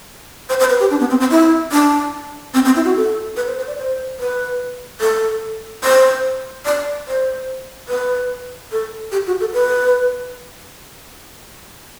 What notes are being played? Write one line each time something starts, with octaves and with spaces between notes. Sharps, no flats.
C5
C5
B4
G4
D4
B3
C4
C4
E4
D4
C4
C4
E4
F#4
A4
B4
C5
C5
D5
C5
B4
A4
C5
D5
C5
B4
A4
G4
F#4
A4
B4